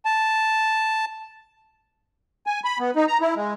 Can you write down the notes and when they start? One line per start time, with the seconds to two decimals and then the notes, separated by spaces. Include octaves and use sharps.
0.05 A5
2.47 G#5
2.64 B5
2.79 B3
2.96 D#4
3.08 A#5
3.21 E4
3.36 G#3